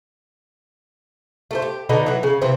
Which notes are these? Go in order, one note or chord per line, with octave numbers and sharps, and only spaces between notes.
A3 A4 C5
G4
B2 D3 D#4
E3 F#3
C#3
C3 E3 C4